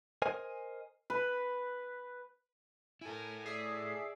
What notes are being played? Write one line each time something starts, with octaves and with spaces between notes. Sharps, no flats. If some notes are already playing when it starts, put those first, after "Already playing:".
A#4 C5 D#5 G#5
B4
E4 A4 A#4 G#5
G#4 D5 E5 C7